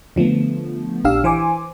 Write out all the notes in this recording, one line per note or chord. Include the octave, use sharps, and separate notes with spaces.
D3 F3 A3 B3
A#1 D4 G4 F5 E6
E3 C5 G#5 D6